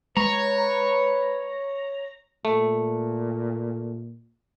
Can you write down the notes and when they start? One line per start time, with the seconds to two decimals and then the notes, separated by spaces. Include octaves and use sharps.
0.17 G#3 B4 C#5 A#5
2.45 A#2 A3